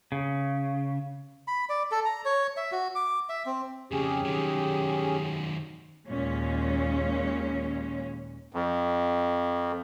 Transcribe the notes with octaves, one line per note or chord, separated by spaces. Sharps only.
C#3
B5
D5
A4
A#5
C#5
E5
F#4
D6
E5
C4
F2 C#3 C#4 G4 G#4
D#3 F#3
D#2 A#2 G#3 C#4
F2